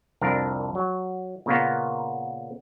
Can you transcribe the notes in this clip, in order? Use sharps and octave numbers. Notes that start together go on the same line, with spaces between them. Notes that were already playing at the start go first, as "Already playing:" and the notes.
C2 F2 D4 A#4
F#3
A#2 C#3 A#3 B3